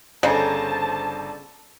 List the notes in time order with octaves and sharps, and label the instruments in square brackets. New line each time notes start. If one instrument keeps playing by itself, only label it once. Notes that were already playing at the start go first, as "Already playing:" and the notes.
[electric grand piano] G1 C5 A#5 [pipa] C#3 [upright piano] D4 A4 [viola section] A5